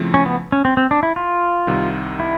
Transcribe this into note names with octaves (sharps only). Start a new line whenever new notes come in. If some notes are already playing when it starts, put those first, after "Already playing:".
Already playing: C#3 F3 A3 C4 E4
C#4
B3
C#4
C4
C4
D4
E4
F4
C2 C3 D#3 G3
E4